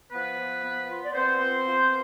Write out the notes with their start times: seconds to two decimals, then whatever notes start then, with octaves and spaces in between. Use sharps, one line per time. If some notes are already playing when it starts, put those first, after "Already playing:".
0.12 F3 B3 B4
0.38 F3
0.63 B3
0.88 F4
1.04 D5
1.14 B3 C4 C5
1.39 B3
1.65 F4